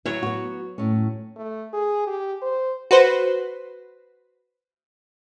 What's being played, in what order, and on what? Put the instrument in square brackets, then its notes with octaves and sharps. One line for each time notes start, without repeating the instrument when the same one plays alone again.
[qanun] F#3 C#5 [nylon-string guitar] E4
[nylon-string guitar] B3 F#4
A2 C#4
[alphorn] A3
G#4
G4
C5
[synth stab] F#4 B4 C5